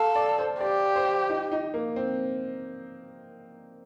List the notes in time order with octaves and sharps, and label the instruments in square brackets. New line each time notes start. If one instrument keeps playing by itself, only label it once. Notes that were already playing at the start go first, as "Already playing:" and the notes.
Already playing: [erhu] A4 [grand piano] F5
[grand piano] D5
C5
[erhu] G4 [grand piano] D5
[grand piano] C5
D#4
D#4
A#3
C4